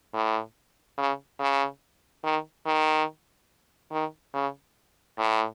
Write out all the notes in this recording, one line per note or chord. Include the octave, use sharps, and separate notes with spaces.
A2
C#3
C#3
D#3
D#3
D#3
C#3
A2